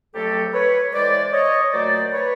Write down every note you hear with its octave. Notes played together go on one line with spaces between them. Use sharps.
F2 C#3 F#3 A3 G4 A4
B4 C#5
A2 E3 G#3 C5 D5
C#5 D#5
A#2 F#3 A3 C5 D5
B4 C#5